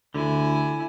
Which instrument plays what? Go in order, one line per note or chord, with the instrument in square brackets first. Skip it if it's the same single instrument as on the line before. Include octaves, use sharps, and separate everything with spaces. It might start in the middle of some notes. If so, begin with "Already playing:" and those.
[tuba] D2 [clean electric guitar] D3 [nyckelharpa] E4 G#5